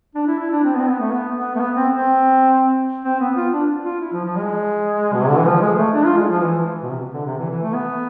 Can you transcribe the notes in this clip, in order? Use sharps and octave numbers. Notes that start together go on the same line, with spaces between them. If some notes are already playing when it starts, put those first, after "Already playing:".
D4
E4
E4
D4
C4
B3
C4
B3
A3
B3
B3
A3
B3
C4
C4
C4
B3
F4
D4
F4
E4
F3
F3
G#3
B2
C3
D3
E3
F3
G#3
A3
D4
F4
G#3
F3
E3
B2
C3
D3
C3
E3
E3
A3
B3